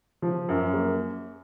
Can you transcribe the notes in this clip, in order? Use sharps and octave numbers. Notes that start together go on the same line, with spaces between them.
F3
F#2
A#3